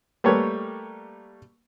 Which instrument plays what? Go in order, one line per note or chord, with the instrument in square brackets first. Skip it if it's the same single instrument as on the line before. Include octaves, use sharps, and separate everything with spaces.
[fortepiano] G3 A3 A#3 B4 C#5